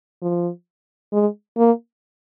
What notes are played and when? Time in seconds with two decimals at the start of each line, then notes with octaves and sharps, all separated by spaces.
0.22 F3
1.13 G#3
1.58 A#3